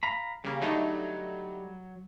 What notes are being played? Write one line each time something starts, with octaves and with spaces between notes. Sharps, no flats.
F5 A#5 B5
C#3 G3 A#3
D3 F#3 A3 D#4